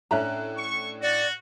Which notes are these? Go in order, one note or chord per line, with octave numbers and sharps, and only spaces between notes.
A2 C#4 D4 E5 A#5 F#6
C#6
F#4 D5